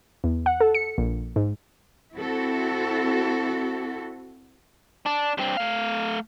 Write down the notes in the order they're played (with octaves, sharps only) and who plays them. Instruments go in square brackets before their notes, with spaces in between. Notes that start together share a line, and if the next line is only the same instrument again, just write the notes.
[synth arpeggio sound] E2
F#5
A4
C#7
A#1
G#2
[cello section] C4 E4 F#4 A4
[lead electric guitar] D4
G2 C4
A3 F5